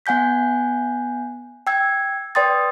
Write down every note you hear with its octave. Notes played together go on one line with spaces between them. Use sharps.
B3 F#5 G#5 G6 B6
G5 E6 G#6
B4 D5 G5 C6 D#6 A6